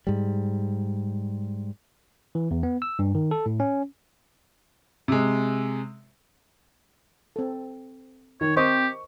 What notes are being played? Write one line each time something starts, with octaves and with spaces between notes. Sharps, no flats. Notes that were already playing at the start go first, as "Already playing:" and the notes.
G#2 G3
E3
E2
B3
E6
G2
D#3
A4
A2
C#4
C3 G#3
C4 A4
D#3 C#5
C4 G4 A#4 C5 D#5 C#6